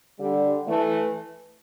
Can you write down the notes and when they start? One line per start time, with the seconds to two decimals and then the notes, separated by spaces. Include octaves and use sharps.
0.19 D3 G3
0.67 E3 A3